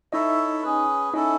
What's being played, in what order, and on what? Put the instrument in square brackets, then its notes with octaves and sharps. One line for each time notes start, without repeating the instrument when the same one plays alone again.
[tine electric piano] D#4 D#5 [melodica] E4 A4 C#5 E5
[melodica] C#4 G#4 B4
[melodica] C#4 E4 A4 [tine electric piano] D#4 D#5